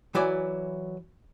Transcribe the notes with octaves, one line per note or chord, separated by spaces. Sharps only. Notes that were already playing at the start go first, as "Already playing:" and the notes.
E3 F#3 E4 D5 G#5